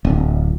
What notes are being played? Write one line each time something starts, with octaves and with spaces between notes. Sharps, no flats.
D1